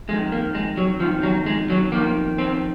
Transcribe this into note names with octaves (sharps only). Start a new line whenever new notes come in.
F2 D#3 G#3
A#3
G#3
F#3
F2 D#3 F3
F#3
G#3
F#3
F2 D#3 A#3
C4